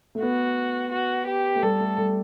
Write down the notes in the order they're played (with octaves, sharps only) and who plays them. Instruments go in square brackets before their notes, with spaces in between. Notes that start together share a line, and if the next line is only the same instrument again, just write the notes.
[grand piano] A3
[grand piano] B3 [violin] F#4
[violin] F#4
G4
[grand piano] A3
[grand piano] G3 [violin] A4
[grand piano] A3
G3